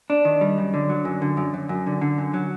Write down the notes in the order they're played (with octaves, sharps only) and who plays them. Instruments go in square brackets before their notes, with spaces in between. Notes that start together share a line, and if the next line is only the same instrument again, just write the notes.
[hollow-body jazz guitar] D4
D#3
G3
F#2
D3
F#3
F#2
D3
F#2
F#2
F#2
D3
D3
F#2
F#3